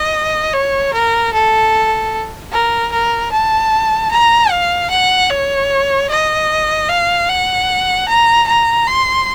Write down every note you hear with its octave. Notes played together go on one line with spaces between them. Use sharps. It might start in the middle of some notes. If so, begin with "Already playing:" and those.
Already playing: D#5
C#5
A#4
A4
A#4
A#4
A5
A#5
F5
F#5
C#5
D#5
F5
F#5
A#5
A#5
C6